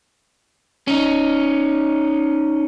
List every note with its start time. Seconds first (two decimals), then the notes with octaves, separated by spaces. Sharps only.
0.88 C#4 D#4